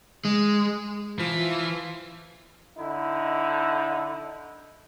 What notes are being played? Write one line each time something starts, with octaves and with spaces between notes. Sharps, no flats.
G#3
E3 F3 F4
D3 D#4 E4